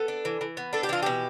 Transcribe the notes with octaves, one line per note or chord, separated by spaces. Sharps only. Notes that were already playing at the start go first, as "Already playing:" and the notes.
Already playing: B3 A4
D4
E3
E3
B3
D4 A4
G4
E3 F4
B2 G4